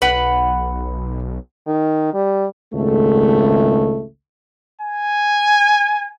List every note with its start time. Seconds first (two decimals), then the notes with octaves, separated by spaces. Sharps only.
0.02 B1 B4 F#5
1.67 D#3
2.14 G3
2.73 G#1 C#2 A3
4.82 G#5